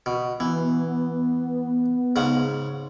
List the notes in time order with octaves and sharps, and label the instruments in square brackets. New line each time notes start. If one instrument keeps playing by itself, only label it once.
[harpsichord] B2
[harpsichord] E3 [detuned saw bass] B3
[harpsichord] G#2 C#3 F#5